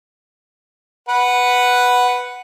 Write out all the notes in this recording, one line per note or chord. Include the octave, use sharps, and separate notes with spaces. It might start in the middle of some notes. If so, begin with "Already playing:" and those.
B4 F#5